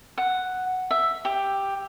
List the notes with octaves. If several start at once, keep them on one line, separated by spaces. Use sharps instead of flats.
F#5
E5
G4